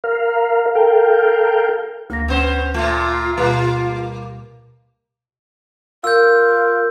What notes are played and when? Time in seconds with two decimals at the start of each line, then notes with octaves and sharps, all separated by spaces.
0.04 A#4 F5
0.75 A4 A#4 F5 G5
2.10 D2 A#3 A#6
2.28 B3 C#4 C5
2.74 A#2 A3 F4
3.37 B2 G3 A#3 B4
6.04 F4 A#4 E6 G6